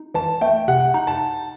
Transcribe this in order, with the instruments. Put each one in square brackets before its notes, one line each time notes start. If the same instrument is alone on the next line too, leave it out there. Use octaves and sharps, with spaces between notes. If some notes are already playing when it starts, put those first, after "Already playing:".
Already playing: [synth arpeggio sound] D#4
[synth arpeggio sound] E3 [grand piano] A5
[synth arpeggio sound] A3 [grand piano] G5
[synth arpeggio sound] C3 [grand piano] F#5
[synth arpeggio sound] D#4
[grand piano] A5